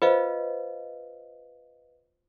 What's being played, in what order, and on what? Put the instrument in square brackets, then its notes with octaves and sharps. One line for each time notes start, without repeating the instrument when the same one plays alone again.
[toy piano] F4 C5 [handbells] B4 D#5 F5